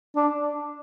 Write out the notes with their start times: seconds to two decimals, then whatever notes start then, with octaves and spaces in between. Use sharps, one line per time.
0.16 D4